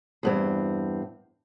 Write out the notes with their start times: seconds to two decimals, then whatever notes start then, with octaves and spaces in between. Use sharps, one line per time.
0.23 E2 G2 C4